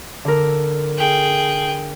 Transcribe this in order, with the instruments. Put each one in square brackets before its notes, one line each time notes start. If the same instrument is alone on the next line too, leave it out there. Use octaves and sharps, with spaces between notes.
[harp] D3 A#4
[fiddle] G#4 G5